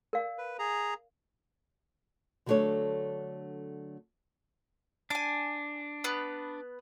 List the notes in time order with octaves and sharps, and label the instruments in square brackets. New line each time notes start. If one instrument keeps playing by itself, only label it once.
[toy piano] A#4 D5 F5
[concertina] B4
G#4 A#5
[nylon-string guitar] D3 F#3 G3 A3 D4 C#5
[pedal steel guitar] D4 [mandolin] G#5 D6
[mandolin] B3 B4